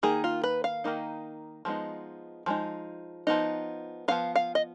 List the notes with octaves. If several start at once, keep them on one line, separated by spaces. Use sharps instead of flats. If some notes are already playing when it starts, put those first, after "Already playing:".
D#3 A#3 D#4 G#4
F4
B4
F5
D#3 A#3 D#4
F3 G#3 B3 D#4
F3 G#3 D#4
F3 B3 D#4
F3 B3 D#4 F5
F5
D#5